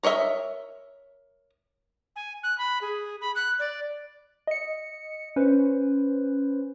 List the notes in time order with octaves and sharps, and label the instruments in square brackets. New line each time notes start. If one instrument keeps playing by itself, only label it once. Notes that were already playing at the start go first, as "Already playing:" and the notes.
[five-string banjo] A#4 C#5 D#5 E5
[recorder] G#5
F#6
B5
G#4
B5
F#6
D5
[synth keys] D#5 C#7
C#4 B4 C5